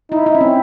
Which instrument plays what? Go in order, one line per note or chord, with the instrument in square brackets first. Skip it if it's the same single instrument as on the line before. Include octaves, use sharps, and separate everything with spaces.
[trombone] D#4 [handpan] E4
[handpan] E4
C#4
C4